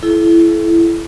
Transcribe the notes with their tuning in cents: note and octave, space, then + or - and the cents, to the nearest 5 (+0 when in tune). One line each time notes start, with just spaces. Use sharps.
E4 +15 A4 -40